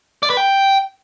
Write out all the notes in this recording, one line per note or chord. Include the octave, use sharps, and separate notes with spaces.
D5
B4
G5